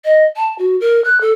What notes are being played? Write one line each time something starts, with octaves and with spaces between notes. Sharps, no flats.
D#5
A5
F#4
A#4
F#6
A4